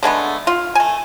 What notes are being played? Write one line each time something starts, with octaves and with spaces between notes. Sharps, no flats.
D3 G#3 A3 B3
F4
A3 G#5